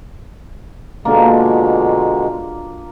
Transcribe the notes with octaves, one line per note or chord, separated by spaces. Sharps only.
B2 D3 G#3 A#3 D4 F4